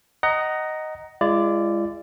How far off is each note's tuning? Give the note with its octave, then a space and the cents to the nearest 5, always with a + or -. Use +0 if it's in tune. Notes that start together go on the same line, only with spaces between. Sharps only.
D#5 +0 F#5 +25 A#5 +0
G#3 -15 F4 -45 D5 +0